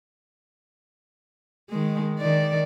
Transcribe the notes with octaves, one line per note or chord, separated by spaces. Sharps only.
D#3 G#3
D#3 D5